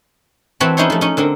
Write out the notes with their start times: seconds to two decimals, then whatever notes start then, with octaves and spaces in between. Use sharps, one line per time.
0.60 E3 C4 F#4 C#5 A5 B5
0.77 C#4 D#4 E4 G#4 C5 C#5
0.90 F3 A3
1.01 C#4 D#4
1.17 D3 C4 A#4